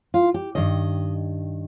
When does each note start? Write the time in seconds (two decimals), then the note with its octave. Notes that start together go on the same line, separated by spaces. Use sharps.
0.14 F4
0.34 G4
0.55 G2 D#3 D#5